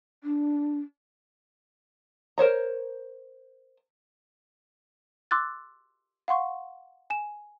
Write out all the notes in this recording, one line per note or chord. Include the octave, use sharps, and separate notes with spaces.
D4
A#4 C5 C#5 A#5
C6 D6 E6 F#6 A6
F5 F#5 C6 C#6
G#5 E7